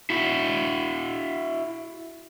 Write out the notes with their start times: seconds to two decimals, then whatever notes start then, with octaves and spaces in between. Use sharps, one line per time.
0.10 E4 F#4